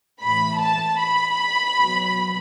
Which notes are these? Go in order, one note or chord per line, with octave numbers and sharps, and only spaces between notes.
A2 E3 B5
A5
B5
B2 F#3